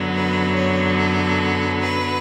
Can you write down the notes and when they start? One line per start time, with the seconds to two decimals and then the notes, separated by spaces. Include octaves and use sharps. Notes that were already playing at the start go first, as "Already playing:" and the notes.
Already playing: F#2 D3 F#3 B3
0.13 B4
0.55 C#5
0.96 A4
1.80 B4